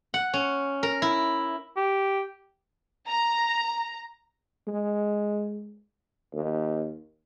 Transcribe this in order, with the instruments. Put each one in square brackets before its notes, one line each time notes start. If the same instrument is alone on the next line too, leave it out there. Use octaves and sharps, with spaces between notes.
[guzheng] F#5
C#4
A#4
E4
[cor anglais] G4
[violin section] A#5
[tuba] G#3
D#2